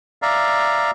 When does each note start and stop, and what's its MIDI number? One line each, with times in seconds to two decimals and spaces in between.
0.22 0.91 74
0.22 0.91 76
0.22 0.91 77
0.22 0.91 82